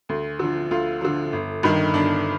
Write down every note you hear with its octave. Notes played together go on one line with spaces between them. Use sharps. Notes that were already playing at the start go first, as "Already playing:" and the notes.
D2
D3 F3
D2 F4
D3 F3
G1
G2 D#3
G1 D4